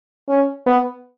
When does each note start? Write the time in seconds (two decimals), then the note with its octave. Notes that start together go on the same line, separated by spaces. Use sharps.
0.29 C#4
0.66 B3